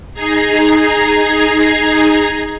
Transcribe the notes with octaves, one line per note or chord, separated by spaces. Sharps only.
D#4 G#4 A#5 G#6 C7